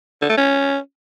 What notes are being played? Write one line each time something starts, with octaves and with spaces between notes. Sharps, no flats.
D3
A3
C#4